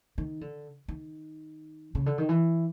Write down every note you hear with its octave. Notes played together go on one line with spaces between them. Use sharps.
D#3
D3
D#3
C#3
D3
D#3
E3